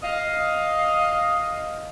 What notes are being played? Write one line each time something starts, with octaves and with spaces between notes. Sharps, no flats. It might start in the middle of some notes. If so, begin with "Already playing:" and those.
D#5 F5